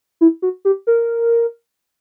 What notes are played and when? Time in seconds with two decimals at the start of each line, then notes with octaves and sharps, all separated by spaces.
0.21 E4
0.42 F#4
0.65 G4
0.87 A#4